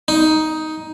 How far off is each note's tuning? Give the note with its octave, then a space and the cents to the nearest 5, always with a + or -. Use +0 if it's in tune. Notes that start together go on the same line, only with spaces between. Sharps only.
D#4 +10